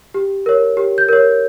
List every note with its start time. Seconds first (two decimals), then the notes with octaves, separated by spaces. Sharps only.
0.14 G4
0.46 A#4 C#5
0.77 G4
0.98 G6
1.09 A#4 C#5